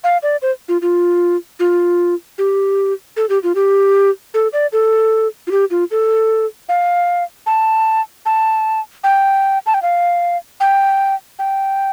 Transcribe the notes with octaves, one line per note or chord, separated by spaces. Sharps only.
F5
D5
C5
F4
F4
F4
G4
A4
G4
F4
G4
A4
D5
A4
F4
G4
F4
A4
F5
A5
A5
G5
A5
G5
F5
G5
G5